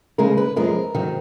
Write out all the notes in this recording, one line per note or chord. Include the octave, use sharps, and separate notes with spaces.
D#2 C#3 G#3 A#4
B4
F#2 F3 G#3 A#4
G#2 D#3 F#3